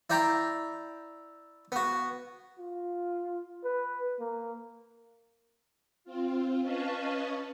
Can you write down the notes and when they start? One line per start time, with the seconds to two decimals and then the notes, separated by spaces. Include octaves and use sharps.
0.10 E4 D5 G5 A#5 C6
1.72 B3 F#4
2.59 F4
3.64 B4
4.20 A#3
6.04 C4 F4
6.62 C#4 B4 D#5 F5 A5 C#6